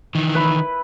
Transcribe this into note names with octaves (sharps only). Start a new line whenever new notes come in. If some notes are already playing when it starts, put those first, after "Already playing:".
D#3 E3
E4 B4